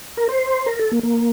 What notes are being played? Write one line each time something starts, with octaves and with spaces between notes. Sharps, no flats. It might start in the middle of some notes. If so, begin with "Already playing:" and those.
A#4
C5
A#4
A4
A#3
A#3